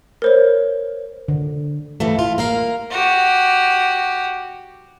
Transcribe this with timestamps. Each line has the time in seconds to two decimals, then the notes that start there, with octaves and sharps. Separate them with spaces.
0.22 A#4 C5 C#5
1.28 D3
2.00 G2 E3 F3 A3
2.19 F4
2.38 A#3 A#4 F5
2.91 F#4 G4